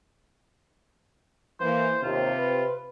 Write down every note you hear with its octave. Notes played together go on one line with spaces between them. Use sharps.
E3 A#3 C5
D#2 C3 F4
B4